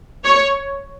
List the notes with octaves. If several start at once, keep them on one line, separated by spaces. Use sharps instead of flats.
C#5